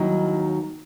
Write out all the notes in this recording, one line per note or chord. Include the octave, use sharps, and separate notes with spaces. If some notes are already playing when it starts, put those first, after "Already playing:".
Already playing: D#2 D#3 F#3 E4